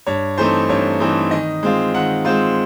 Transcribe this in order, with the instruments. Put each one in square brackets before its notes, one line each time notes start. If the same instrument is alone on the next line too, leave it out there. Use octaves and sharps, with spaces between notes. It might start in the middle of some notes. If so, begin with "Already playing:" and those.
[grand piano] G2 C#5
E3 A3 C4 D#4 C5
G2 C#5
E3 A3 C4 D#4
D#3 D#5
G#3 C4 F4
D#3 F#5
G#3 C4 F4 C5